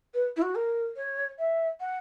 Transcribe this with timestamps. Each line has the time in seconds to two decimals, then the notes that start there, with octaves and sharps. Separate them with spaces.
0.14 B4
0.37 E4
0.42 F#4
0.55 A#4
0.96 C#5
1.39 E5
1.80 F#5